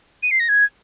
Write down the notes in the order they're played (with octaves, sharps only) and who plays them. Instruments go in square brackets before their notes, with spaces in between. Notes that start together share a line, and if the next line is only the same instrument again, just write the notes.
[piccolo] D#7
C7
A#6
G#6